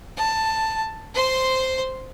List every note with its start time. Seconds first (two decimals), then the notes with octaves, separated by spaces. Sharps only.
0.17 A5
1.15 C5 C6